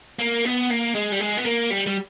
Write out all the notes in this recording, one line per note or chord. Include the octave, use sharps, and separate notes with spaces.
A#3
B3
A#3
G#3
G3
G#3
B3
A#3
G3
G3